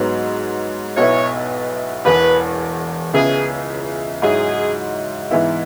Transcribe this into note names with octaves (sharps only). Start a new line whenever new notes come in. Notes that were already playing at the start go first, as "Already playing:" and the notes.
Already playing: G#2 F#3 B3
B1 B2 B3 E4 C#5
E1 E2 E3 B4
C#2 C#3 E3 B3 E4 G#4
G#2 F#3 E4 G#4
G#2 E3 B3 E4